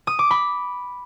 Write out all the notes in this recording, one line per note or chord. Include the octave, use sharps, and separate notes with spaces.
D#6
D6
B5